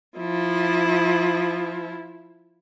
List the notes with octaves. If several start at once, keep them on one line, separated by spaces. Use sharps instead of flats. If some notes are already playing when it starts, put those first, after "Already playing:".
F3 E4